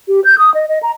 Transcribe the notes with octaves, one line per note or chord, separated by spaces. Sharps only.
G4
G6
D#6
D#5
D#5
A#5